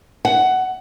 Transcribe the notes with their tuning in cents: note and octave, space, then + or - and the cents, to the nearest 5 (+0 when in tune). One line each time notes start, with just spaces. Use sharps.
F#5 +15